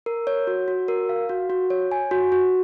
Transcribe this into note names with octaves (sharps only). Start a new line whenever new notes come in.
A#4
C#5
F#4
F#4
A#4
F5
F#4
F#4
C#5
G#5
F#4
F#4